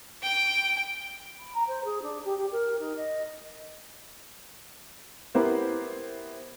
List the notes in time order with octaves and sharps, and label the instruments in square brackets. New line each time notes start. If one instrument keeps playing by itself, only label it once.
[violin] G5 D7
[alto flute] B5
A#5
C5
G#4
D4
G4
G4
A#4
D#4
D#5
[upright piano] B3 E4 G4 A#4 C5